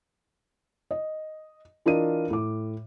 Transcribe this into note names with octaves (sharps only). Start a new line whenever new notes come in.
D#5
E3 D4 F4 A#4 D#5 D#7
A2 D6